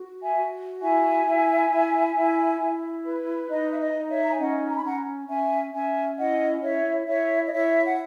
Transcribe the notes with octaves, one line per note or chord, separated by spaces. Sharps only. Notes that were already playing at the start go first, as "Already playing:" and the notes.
Already playing: F#4
E5 G#5
F#4
E4 E5 G#5
E4
E4
E4
E4
B4
D#4 D#5
E5
D#5
D#4
C#5 E5
A#5
G#5
C#4 D#5 F#5
A#5
B5
C#4 F#5 A#5
C#4 E5 G#5
C#4 E5 G#5
E4 D#5 F#5
E4 C#5 E5
E4 C#5 E5
D#5
E4 C#5 E5
F#5